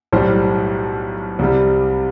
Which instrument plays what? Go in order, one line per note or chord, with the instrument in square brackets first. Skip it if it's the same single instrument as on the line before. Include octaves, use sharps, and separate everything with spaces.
[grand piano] B1 A2 G3 C5
C2 C3 G3